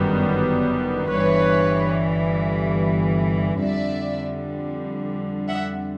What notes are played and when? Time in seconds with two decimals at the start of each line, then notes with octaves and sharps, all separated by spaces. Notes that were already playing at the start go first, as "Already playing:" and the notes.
Already playing: G1 F#2 D#3 G3 B3
1.10 G1 G2 E3 B4 C#5
3.61 F2 D3 G3 D5 E5
5.49 E5 F#5